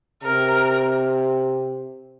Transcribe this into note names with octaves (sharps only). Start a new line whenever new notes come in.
C3 A#4